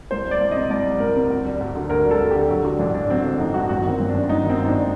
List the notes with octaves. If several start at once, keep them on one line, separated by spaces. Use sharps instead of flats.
C2 C5
G3
D5
C2
C3 D#5
C2 D5
G3
C2 A#4
C3
D2
G3
D2
D3
D2 A#4
G3
A4
D2
D3 G4
A4
F#3 G4
D3 F#4
A1 D4
G2 D4
F#3 C4
D3 D4
A1 D#4
G2 F#4
G1 F#4
D#3 C4
G1
D4
F#2
G1 D#4
D#3
C4
G1
D#4
D4